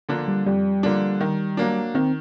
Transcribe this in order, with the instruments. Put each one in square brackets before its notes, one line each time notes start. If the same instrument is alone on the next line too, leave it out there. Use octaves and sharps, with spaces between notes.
[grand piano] D3 F3 A#3 D4
[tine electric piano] G3
[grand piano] F2 [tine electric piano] G3
[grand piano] D3 F3 A#3 D4
D#3
F#3 A#3 D4
[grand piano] D#3 [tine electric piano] C4